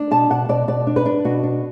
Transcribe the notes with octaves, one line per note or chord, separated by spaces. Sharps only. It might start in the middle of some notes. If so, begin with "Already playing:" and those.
Already playing: D4
B2 A5
B2 F#5
B2 D5
B2 D5
D4
B4
D4
B2 F#4
D4